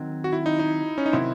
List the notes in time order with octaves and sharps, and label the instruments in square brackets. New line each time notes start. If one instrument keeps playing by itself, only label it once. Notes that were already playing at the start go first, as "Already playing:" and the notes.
Already playing: [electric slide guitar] D#3 F#3 C4
[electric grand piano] F#4
E4
D#4
D#4
C#4
D#4
[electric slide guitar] C3 D#3 F#3 C4 [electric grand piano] E4